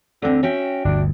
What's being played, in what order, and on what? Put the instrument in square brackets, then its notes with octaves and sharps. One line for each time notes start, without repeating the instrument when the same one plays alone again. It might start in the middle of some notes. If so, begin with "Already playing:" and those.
[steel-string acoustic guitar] D2 C4 [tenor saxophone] D3
[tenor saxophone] C#4 [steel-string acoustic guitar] F#4 E5 G5
[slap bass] G1 D2 [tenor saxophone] D4